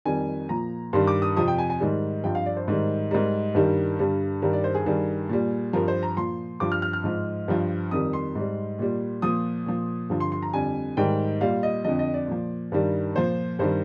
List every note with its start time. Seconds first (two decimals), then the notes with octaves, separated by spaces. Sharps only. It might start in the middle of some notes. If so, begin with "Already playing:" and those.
0.05 F2 D#3 G3 G#5
0.49 A#2 F3 A#5
0.93 G2 D#3 G3 C6
1.07 D6
1.22 D#6
1.37 F2 C3 F3 D#6
1.48 G5
1.58 G#5
1.70 G#5
1.80 G#2 D#3 G3
2.24 G2 F3 G5
2.35 F5
2.46 D5
2.57 C5
2.68 G#2 D#3 G3
3.11 G#2 G3 A#4
3.55 G2 D#3 G3
3.99 G2 D3 G3
4.42 G2 D#3 G3 A#4
4.53 D5
4.64 C5
4.75 G#4
4.86 G2 D#3 G3
5.29 A#2 G3
5.73 G2 F3 A#4
5.88 C5
6.03 A#5
6.17 A#2 F3 C6
6.60 G2 F3 D6
6.72 F6
6.82 F6
6.93 F6
7.04 G#2 F3
7.48 G2 F3
7.91 F2 D#3 G3 D#6
8.13 C6
8.35 G#2 G3
8.79 A#2 G3
9.22 A#2 F3 D#6
9.66 A#2 F3
10.10 G2 D3 F3
10.20 C6
10.32 C6
10.42 A#5
10.53 F2 D3 G3 G#5
10.97 G#2 D#3 G3 G5
11.41 A#2 G3 F5
11.63 D#5
11.84 F2 D3 F3 D#5
11.99 D#5
12.14 D5
12.28 A#2 F3
12.72 G2 D#3 G3
13.16 A#2 F3 C5
13.59 G2 D#3 G3 C5